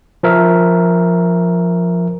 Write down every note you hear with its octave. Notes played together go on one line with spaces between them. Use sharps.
F3 A#4 E5